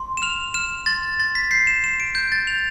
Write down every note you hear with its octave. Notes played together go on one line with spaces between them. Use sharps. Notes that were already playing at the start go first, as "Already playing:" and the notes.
Already playing: C6
E7
F6 F7
F6 E7
C6 A6
C6 A6
B6
G6 C7
E7
C6 E7
D7
G6
A6
G6 F7